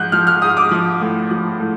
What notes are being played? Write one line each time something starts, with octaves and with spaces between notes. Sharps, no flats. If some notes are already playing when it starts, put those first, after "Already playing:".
Already playing: G#2 F3 F#6 G6
F3 F6
F6
G#2 D#6
D6
F3
A2
F3
A2